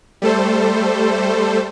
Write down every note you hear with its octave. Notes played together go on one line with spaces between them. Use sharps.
G3 A3 A4 C5